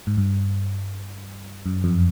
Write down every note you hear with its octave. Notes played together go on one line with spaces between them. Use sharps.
G#2
G2
F#2
F2